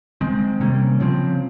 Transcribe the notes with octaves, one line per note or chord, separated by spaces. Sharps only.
D#3 G#3 C4
C3 G3 A#3 C#4
C#3 F3 C4